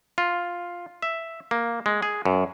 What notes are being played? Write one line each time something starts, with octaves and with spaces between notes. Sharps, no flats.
F4
E5
A#3
G#3
G#4
F#2